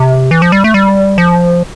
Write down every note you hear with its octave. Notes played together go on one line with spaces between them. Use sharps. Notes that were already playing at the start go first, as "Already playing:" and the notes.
Already playing: C3
E3
F3
G3
A3
G3
F3